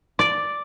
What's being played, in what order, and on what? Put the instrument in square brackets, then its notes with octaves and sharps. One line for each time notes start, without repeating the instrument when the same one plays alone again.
[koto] D5